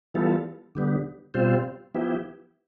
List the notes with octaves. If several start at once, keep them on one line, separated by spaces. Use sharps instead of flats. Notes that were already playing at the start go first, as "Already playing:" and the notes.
E3 G3 B3 F4 A4
D3 G3 B3
B2 G3 C4 F4 C5
F3 B3 E4 G4